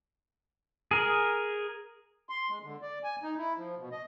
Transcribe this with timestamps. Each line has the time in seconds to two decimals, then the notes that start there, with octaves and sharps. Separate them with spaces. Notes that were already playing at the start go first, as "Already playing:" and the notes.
0.91 G#4 A#4
2.29 C6
2.49 G#3
2.63 D3
2.82 D5
3.04 G#5
3.23 D#4
3.37 E4
3.57 F3
3.78 B2
3.92 D#5